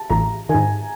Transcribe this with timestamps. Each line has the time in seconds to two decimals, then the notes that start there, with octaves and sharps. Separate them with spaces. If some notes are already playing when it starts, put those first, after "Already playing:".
Already playing: A5
0.10 A1 A#5
0.49 D#3 G#5
0.54 G#2